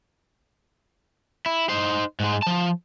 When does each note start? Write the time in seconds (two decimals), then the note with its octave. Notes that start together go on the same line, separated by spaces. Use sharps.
1.46 E4
1.69 D#4 C5
2.20 G#2 G#3
2.42 F3 A5